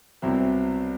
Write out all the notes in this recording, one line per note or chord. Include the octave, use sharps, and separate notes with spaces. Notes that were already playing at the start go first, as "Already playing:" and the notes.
C2 B2 F#3 C4 E4